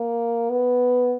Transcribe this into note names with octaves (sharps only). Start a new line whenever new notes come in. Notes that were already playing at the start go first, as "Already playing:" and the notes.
Already playing: A#3
B3